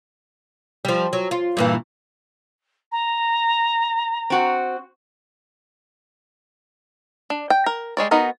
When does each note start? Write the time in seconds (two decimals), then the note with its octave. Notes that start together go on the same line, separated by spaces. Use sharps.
0.85 F3 G3
1.13 F#3
1.31 F4
1.57 G2 A#2 E3
2.92 A#5
4.30 C4 F#4
7.30 D4
7.50 G5
7.66 A#4
7.97 G3 G#3 C#5 D5
8.11 B3 D#4 F#4 A#4